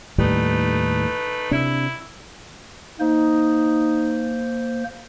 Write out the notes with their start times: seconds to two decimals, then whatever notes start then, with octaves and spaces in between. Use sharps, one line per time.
0.18 D#2 A2 G3 A3 D#4 B4
1.51 C3 D4 E4
3.00 A#3 D#4 C5